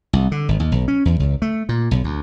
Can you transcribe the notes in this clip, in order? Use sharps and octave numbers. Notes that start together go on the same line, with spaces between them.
C2
D3
G#1
D#2
B1
C#4
E2
C#2
A3
A#2
B1
D2